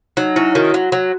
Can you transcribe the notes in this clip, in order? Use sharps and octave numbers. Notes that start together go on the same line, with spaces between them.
F#3 D#4
C#4 E4
D#3 F#4
F#3
F#3